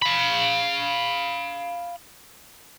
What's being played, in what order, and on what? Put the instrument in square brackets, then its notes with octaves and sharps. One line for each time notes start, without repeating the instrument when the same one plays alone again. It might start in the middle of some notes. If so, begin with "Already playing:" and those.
[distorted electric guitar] F5 B5